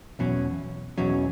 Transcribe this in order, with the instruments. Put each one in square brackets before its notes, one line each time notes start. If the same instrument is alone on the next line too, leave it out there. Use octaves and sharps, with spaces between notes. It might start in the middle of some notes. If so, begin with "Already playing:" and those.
[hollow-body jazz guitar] E2 B2 F#3 C#4
E2 B2 F#3 C#4